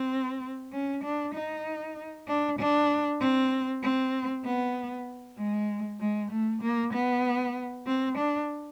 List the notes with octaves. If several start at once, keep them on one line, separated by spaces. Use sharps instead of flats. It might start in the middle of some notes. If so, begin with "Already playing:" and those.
Already playing: C4
C#4
D4
D#4
D4
D4
C4
C4
B3
G#3
G#3
A3
A#3
B3
C4
D4